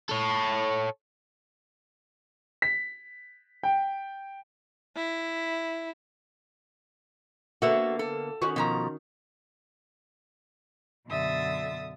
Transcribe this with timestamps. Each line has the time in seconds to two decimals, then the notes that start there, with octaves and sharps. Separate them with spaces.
0.09 A4 C#5
2.62 B6
3.63 G5
4.96 E4
7.62 D3 A#3 B3 F#4 A4 E5
7.99 A4
8.42 D#3 C#4 F#4
8.56 B2 F3 A#5
11.07 F#2 B2 D3 E5 D#6 A6